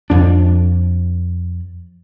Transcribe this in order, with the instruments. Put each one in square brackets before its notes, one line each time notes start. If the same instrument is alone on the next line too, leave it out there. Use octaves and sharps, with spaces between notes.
[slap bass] F2 D4